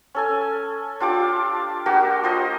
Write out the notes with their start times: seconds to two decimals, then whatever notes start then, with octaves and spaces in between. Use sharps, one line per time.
0.15 C#4 A4 G#5
1.00 D4 F4 G4 D6
1.86 A#3 D4 F#4 G4
2.24 F4 C5 D#5